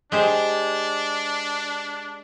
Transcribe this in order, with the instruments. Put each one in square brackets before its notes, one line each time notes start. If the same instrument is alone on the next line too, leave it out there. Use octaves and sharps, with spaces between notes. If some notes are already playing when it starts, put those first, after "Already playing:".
[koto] G#3 G4 C5 [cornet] D4